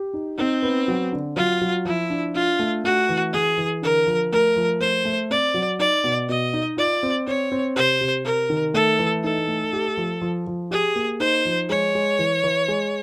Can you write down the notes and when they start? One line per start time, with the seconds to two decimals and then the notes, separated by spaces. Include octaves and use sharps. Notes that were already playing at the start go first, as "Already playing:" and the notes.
Already playing: G4
0.14 D#4
0.38 C4 D#4
0.62 B3
0.88 F#3
1.13 D3
1.36 F#3 F4
1.61 F#3
1.85 F3 E4
2.10 D4
2.35 D4 F4
2.59 A3
2.84 A3 F#4
3.09 E3
3.33 E3 G#4
3.58 E3
3.82 D3 A#4
4.07 F3
4.32 A3 A#4
4.56 F3
4.80 A3 C5
5.05 A3
5.31 C4 D5
5.54 F#3
5.79 D#4 D5
6.04 B2
6.29 B2 D#5
6.53 D#4
6.77 F4 D5
7.03 C4
7.27 C4 C#5
7.52 C4
7.76 C3 C5
8.01 C3
8.25 C3 A#4
8.50 D#3
8.74 A3 A4
8.99 E3
9.24 D#4 A4
9.48 A3
9.73 G4
9.97 F3
10.21 F3
10.47 F3
10.71 G4 G#4
10.96 A#3
11.20 D#4 C5
11.45 F3
11.69 G#3 C#5
11.95 G#3
12.19 E3
12.44 E3
12.68 G#3